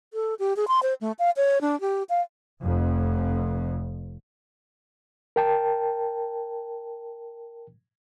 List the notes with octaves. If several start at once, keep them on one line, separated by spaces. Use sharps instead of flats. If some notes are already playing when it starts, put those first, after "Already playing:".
A4
G4
G#4
C6
C5
A3
F5
C#5
D4
G4
F5
F1 F2
A#4 G5 A5